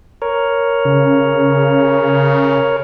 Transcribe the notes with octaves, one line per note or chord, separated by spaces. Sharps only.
A#4 C#5
C#3